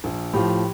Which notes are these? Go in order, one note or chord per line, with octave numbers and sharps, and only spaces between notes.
A#1
A2 F3 G4